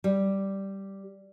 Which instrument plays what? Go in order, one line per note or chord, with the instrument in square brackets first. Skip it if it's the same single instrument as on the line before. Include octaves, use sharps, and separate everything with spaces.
[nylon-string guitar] G3